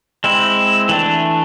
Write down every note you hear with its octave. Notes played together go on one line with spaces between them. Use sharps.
G#3 C4 E4
E3 A3 D4